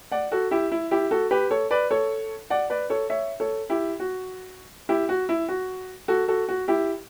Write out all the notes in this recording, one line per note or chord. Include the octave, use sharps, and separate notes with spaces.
D5 F#5
F#4 A4
E4 G4
E4
E4 G4
F#4 A4
G4 B4
A4 C#5
B4 D5
A4 C#5
D5 F#5
B4 D5
A4 C#5
C#5 E5
A4 C#5
E4 G4
F#4
E4 G4
F#4
E4
F#4
F#4 A4
F#4 A4
F#4
E4 G4